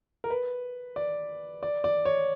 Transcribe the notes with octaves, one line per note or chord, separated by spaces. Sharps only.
A#4
B4
D5
D5
D5
C#5